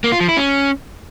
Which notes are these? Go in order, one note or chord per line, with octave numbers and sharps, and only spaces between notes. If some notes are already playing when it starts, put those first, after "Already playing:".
A#3
F4
F3
E4
C#4